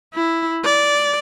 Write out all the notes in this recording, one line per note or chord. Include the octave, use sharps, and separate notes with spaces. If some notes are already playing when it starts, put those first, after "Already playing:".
E4
D5